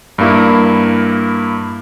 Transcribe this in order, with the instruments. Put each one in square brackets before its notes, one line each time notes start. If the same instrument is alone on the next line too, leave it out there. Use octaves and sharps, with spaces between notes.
[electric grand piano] G2 A#3 E4